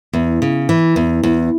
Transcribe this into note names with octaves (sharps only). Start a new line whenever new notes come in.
E2
C#3
E3
E2
E2